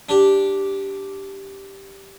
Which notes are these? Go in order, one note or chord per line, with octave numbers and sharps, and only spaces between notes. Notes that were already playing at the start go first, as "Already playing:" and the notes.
D4 G4